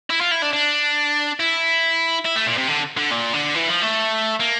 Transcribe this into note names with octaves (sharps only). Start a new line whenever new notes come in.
E4
F4
E4
D4
D4
E4
E4
A3
A#2
C3
D3
D3
A#2
D3
E3
F3
A3
A#3